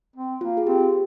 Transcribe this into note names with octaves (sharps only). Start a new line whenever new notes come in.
C4
A#3 F4
G#4
C4 G4